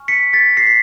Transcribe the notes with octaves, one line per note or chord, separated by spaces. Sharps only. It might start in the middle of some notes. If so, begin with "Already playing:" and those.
Already playing: G#5 C#6 F6
B6 C#7
A6 B6
A#6 C7
B6